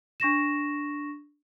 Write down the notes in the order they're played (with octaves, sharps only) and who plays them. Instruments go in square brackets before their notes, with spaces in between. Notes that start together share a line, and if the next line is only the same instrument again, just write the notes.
[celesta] D4 C#6 A#6 E7